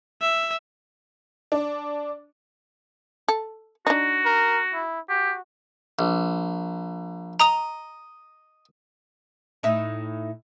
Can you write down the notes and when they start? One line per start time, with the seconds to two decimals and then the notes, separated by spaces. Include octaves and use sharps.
0.22 E5
1.52 D4
3.28 A4
3.87 D4 D#4 F#4
4.25 A#4
4.74 E4
5.09 F#4 G4
5.99 A#1
7.40 D#5 A#5 D#6 F7
9.63 A2 D#4 E5